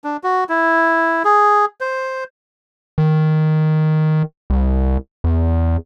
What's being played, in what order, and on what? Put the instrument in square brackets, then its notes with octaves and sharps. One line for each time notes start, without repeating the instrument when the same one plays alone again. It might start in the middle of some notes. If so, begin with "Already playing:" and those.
[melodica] D4
F#4
E4
G#4
C5
[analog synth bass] D#3
C2
E2